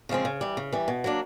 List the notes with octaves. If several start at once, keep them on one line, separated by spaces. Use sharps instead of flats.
C#3 F3 G#3 C4
C#3
E3 G3
C#3
E3 G3
B2
F#3 A#3 D4